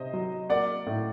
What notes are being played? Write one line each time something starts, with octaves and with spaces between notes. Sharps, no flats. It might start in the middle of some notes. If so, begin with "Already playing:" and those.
Already playing: C3 C5 D#5
F#3
A#3 D5 F#5
A2